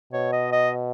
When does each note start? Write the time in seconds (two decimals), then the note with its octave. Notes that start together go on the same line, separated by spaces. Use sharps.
0.13 B2 C#5
0.32 D#5
0.52 D#5